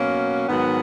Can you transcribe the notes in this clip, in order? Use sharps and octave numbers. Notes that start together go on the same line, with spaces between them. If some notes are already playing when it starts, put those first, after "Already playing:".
Already playing: B2 F#3 A#3 C#4
G#2 D#3 F#3 B3